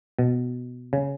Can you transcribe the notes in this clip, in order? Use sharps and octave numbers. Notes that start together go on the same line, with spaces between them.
B2
C#3